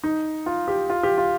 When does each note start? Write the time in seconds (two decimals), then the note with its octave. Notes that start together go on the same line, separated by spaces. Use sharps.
0.04 D#4
0.46 F4
0.68 G4
0.90 F4
1.03 G4
1.18 F4